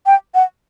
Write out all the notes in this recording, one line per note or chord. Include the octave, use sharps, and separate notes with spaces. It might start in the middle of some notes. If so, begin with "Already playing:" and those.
G5
F#5